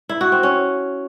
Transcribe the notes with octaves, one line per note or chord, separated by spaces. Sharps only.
E4
F#4
C4
C#4